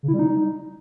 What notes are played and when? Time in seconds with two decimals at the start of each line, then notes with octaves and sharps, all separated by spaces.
0.03 C#3
0.08 E4
0.14 G3
0.19 D#4